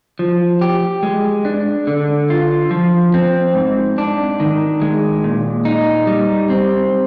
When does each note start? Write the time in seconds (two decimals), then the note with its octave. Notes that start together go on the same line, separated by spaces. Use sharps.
0.19 F3
0.61 G4
1.03 G#3
1.45 D4
1.87 D3
2.30 F4
2.71 F3
3.14 C4
3.55 G#2
3.98 D4
4.40 D#3
4.82 G#3
5.24 A#2
5.65 D#4
6.07 G3
6.50 C4